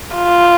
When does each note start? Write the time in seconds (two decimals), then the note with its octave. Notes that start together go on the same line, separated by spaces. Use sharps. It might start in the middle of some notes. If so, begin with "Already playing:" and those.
0.15 F4